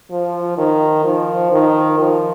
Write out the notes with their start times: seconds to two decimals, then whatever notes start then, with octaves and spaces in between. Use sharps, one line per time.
0.11 F3
0.58 D#3
1.04 F3
1.52 D#3
1.99 F3